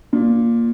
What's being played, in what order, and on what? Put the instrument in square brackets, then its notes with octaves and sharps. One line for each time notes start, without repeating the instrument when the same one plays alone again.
[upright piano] A#2